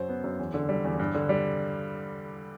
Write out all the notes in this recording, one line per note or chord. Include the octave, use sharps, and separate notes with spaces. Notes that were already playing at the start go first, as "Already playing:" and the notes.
Already playing: F#2 F#3 C5
B3
F#2
E2
D3
G3
E2
G2
D3
G3